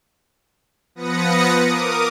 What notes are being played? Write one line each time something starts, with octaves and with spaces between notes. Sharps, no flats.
F3 B3 B4 D#6 A#6 C#7
A#4 D6 D#6